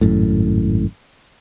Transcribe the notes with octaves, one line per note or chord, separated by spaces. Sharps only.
G#1 F#2 A2